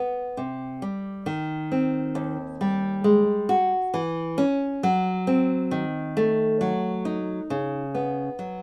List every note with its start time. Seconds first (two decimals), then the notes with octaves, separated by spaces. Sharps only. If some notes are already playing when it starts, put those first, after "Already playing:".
Already playing: B3
0.37 C3
0.82 G3
1.26 D#3
1.72 C4
2.15 D#2
2.61 G3
3.04 G#3
3.49 F#4
3.94 E3
4.38 C#4
4.83 F#3
5.27 C4
5.71 D#3
6.17 A3
6.61 F#3
7.05 D#4
7.50 C#3
7.95 B3
8.39 F#3